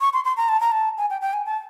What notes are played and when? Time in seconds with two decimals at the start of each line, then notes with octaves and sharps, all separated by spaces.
0.01 C#6
0.13 C6
0.24 C6
0.37 A#5
0.49 A5
0.60 A#5
0.72 A5
0.98 G#5
1.10 G5
1.21 G5
1.33 G#5
1.46 A5